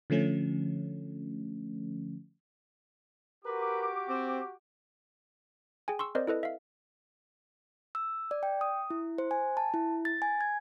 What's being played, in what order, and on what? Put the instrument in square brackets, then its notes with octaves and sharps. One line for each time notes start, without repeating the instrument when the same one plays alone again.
[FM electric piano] D3 F3 A3 C#4
[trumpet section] F#4 G4 D6 [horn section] A#4 B4
[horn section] C4
[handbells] G#4 G5 G#5
C6 C#6 E6
C4 A#4 C5 D5 D#5
E4 A4 B4 D#5
E5 F5
[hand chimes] E6
D5
G5
D#6
E4
C5
G#5
A5
E4
A6
G#5
G#6